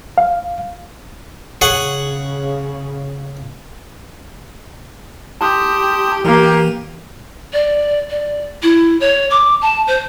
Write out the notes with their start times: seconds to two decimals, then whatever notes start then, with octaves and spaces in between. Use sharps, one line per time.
0.18 F5
1.61 C#3 G#4 C#5 F#5
5.41 G4 A5 C6 D#6
6.25 E3 A#3 G4
7.53 D5
8.10 D5
8.63 E4
9.00 C#5
9.30 D6
9.61 A5
9.87 C5